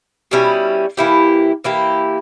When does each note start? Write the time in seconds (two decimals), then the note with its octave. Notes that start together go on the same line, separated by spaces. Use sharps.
0.31 B2 G3 C#4 E4
0.97 E3 A#3 E4 G4
1.64 E3 A#3 E4 G4